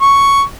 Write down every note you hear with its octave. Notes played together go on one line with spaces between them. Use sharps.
C#6